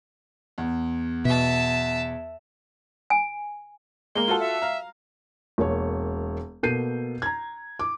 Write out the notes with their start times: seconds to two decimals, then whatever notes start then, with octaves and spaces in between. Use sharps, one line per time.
0.58 E2
1.25 B2 E5 A5
3.10 G#5
4.15 G#3 A#3 G7
4.28 F4 F#4 A4
4.40 E5
4.62 F5 A#5
5.58 E1 A#3 C#5
6.63 B2 A#3 A4 G6 C7 D#7
7.22 A#5 G#6
7.79 D6